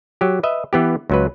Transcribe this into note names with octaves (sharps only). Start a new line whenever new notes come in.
F#3 G4
B4 D#5 E5
E3 B3 G4
C#2 F#3 B4